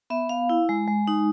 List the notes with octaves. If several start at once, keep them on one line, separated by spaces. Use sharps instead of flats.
B3 E5
B3 F5
E4
G#3
G#3
D#4